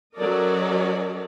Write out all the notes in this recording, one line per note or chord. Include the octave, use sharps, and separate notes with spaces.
F#3 C#4 A4 A#4 D5 D#5